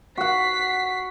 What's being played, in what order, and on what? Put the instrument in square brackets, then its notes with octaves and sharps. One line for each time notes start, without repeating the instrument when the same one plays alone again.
[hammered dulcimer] F#4 F#5 [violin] B6 C7